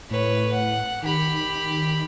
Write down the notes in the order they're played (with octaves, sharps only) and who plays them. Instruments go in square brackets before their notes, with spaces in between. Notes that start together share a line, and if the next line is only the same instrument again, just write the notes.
[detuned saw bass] A2 [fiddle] B4 C#5
[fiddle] F#5
[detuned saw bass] D#3 [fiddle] G4 B5